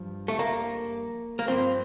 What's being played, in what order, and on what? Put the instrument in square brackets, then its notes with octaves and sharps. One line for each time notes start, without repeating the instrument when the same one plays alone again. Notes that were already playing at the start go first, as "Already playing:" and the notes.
Already playing: [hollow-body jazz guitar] G2 F3
A3
A#3
A#3
G2 F3 C4